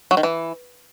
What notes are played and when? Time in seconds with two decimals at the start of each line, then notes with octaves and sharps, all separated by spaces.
0.11 F#3
0.17 D#3
0.23 E3